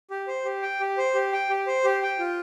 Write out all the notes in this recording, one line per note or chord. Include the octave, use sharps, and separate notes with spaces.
G4
C5
G4
G5
G4
C5
G4
G5
G4
C5
G4
G5
F4